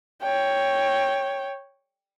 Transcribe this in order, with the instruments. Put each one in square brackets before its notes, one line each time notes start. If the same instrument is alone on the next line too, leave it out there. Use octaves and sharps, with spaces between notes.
[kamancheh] C#5 G5